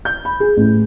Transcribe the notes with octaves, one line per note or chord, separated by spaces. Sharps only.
G6
B5
G#4
A1